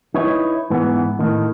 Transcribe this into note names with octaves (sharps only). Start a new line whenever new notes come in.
D#4 E4 B4 C#5
G#2 E3 B3
A2 D#3